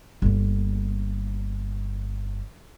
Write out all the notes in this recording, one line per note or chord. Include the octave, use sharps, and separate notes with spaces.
G1 A#3